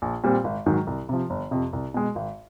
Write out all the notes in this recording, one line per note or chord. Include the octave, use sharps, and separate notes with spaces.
A#1
A#2 G3 C4
G#1
G#2 D#3 F#3
C2
C3 F3
G1
F2 C3
C2
B2 G#3
G#1